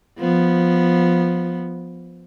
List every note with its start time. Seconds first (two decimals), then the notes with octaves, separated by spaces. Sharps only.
0.19 F3 B3